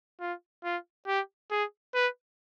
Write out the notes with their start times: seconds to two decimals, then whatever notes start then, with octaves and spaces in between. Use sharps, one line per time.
0.20 F4
0.64 F4
1.07 G4
1.51 G#4
1.94 B4